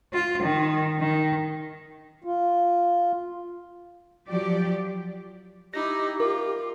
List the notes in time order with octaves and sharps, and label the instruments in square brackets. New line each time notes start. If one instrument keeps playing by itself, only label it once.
[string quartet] F4
D#3
D#3
[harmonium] F4
[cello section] F3 F#3 G4 D5
[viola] D#4 E4 [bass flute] G4 [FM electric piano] A#6
[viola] F4 [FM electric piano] A#4